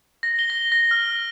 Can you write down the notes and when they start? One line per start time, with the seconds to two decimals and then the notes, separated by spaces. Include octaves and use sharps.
0.23 A#6
0.39 G7
0.50 A#6
0.72 A#6
0.91 F6